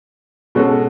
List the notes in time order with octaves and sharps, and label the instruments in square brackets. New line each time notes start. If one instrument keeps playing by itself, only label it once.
[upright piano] B2 G#3 C#4 F#4 A4